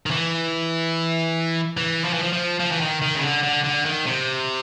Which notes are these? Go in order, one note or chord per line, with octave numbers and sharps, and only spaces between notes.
D#3
E3
E3
F3
E3
F3
F3
F3
E3
D#3
D#3
C#3
D3
D3
D3
D#3
C3